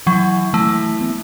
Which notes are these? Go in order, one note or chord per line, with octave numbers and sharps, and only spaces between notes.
E3 F#3
E3 A3
B3